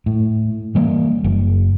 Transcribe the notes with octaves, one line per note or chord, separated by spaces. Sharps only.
A2
E3 G3 A#3
F#1